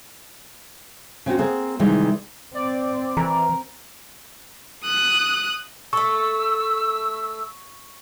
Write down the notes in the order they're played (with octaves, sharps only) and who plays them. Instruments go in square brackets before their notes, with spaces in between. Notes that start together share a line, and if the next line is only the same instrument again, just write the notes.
[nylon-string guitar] C#3 C4 F4 F#4
A#3 C4 G#4 A#4 F#5
C3 D#3 E3 G3 G#3
[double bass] C4 [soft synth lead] D5
[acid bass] E3 [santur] A#4
[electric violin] D#6 F#6
[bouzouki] A3 A4 [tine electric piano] C#6 [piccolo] E6